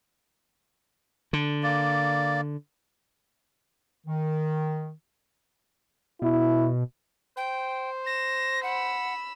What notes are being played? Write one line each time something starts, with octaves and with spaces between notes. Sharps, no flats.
D3
A#3 D5
D#3
B2 E4
C5 G5
A#6 E7
F#5 B5 E6